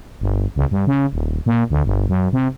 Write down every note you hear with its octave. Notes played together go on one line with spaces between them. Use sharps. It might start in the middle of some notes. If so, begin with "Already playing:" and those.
G1
C#2
G2
C#3
D#1
A#2
D2
G1
F#2
C3